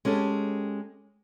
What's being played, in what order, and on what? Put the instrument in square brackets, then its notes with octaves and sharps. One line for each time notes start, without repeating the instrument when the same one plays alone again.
[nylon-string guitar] G#3 C#4 G4 A4